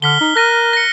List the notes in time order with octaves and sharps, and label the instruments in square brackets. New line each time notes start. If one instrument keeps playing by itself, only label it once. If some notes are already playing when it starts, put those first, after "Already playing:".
[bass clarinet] D3 [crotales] F6 B6 G7
[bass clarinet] D#4
[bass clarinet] A#4 [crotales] F#6 A#6 D#7
[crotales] A#6 C#7